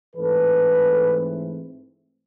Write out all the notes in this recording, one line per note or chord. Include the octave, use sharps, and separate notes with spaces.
G#2 E3 A3 C4 A4 B4